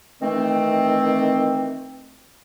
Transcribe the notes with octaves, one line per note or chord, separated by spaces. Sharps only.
D#3 E3 A3 C4